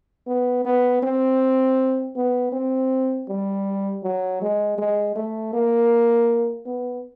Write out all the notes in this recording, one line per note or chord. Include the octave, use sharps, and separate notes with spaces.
B3
B3
C4
B3
C4
G3
F#3
G#3
G#3
A3
A#3
B3